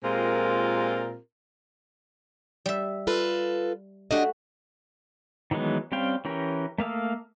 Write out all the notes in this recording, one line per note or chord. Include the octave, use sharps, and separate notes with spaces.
A#2 G#3 C4 F4 G4 A#4
G3 E5
F4 A4 B4
A3 D4 F#4 G4 D#5
D#3 E3 F#3 G#3 B3
G3 C4 C#4 F5 G5
E3 C#4 G4 A#4
A3 A#3 F5 D#6 E6